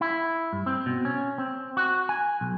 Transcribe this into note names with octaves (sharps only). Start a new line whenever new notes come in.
E4
G2
C4
B2
C#4
C4
F#4
G#5
B1